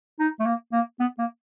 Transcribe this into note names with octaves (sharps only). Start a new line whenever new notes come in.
D#4
A3
A#3
A#3
B3
A#3